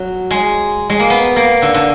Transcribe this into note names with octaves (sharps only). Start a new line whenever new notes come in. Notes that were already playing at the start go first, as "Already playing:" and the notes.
Already playing: F#3
G#3
G#3
A#3
B3
A#3
D3
D3